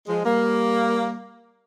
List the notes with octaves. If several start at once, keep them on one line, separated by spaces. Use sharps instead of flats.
F3 G#3
G3 A#3